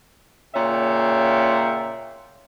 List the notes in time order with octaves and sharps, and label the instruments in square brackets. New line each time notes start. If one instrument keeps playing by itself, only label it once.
[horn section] A#2 C#3 C#4 E5 G5